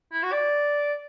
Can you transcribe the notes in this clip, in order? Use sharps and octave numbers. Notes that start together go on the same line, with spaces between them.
E4
F#4
D5